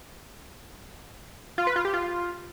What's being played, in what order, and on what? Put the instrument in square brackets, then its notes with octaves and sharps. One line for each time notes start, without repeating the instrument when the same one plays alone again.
[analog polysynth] F4
B4
F4
G4
F4